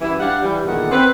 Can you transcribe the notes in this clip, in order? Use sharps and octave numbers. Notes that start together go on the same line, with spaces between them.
F#2 E3 G3 E4
G3 D4 G4 F5 F#5
E3 G3
E2 A#2 D3 D#3 G#4 F#5
C4 B4